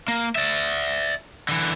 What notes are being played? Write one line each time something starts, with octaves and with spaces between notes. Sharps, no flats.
A#3
D5 E5
D3 E3